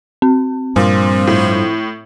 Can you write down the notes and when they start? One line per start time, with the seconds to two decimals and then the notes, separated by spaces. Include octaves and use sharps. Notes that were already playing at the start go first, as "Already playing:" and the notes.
0.22 C4
0.76 G2 A#2 F3
1.27 A2